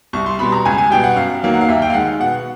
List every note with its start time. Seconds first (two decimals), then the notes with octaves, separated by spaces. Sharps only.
0.13 C2 C#6
0.26 C6
0.39 B2 G3 B5
0.52 A#5
0.65 C#2 G#5
0.78 G#5
0.91 B2 G3 G5
1.04 F#5
1.16 F#2 F5
1.43 D#3 F#3 A#3
1.54 F#5
1.61 F5
1.68 D#2 E5
1.82 G5
1.90 F5
1.94 D#3 G#3 F#5
2.20 B2 F#5